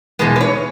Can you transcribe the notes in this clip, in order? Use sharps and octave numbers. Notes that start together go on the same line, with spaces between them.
E2 B2 G#3 B4
B4
C#5